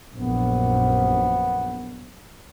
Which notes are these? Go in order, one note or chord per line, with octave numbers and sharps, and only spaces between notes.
A#1 F#2 B3